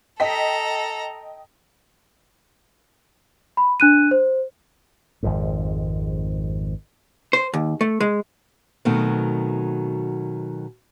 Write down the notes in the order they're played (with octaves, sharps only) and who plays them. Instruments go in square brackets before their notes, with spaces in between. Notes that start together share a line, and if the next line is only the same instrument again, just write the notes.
[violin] A4 A#5 [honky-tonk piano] D#5 G5 B6
[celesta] B5
D4 F#6 D#7
C5
[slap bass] G#1 F2 G#2
[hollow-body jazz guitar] C5
D#2
A3
G#3
[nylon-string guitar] B2 D#3 F#3 A3 C4